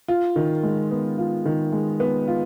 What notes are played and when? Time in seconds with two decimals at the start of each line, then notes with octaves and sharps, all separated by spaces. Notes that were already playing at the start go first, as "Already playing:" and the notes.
0.08 F4
0.36 D#3
0.63 G#3
0.91 B3
1.18 F4
1.45 D#3
1.72 G#3
2.00 B3
2.28 F4